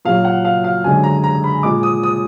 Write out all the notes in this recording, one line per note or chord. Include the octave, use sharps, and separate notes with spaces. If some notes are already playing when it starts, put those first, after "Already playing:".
A#2 F#3 F5
F#5
F5
F5
F#2 D3 G#3 G#5
A#5
A#5
B5
A#2 G#3 D6
D#6
D#6